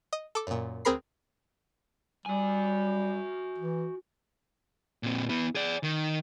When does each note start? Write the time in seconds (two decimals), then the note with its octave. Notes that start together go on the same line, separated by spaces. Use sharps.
0.13 D#5
0.35 A4 D6
0.47 F#2 A#2
0.85 D2 C4 G#4 A#4 B5 C7
2.26 G3 F#4 G#5
3.58 E3
5.03 A#2 C4
5.29 B3 E4
5.55 G#4 D5
5.83 D#3